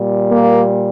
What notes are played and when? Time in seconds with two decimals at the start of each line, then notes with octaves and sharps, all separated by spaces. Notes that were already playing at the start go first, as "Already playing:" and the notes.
Already playing: A#2 G3
0.31 A#3